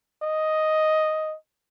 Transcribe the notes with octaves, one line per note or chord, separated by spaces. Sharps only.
D#5